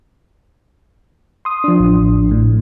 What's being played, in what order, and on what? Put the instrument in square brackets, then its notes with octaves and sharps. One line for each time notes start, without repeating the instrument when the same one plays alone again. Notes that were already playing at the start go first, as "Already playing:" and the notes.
[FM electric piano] C6 D#6
[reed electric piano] F3 D4
[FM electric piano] A1
A2